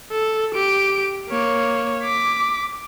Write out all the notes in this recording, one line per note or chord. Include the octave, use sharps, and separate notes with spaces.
A4
G4 D7
A#3 C#5
D6 B6